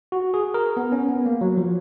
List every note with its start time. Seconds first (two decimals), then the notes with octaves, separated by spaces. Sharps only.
0.12 F#4
0.34 G#4
0.54 A#4
0.77 B3
0.92 C#4
1.09 B3
1.26 A#3
1.41 F#3
1.57 F3